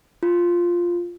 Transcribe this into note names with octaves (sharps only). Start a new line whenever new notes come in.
F4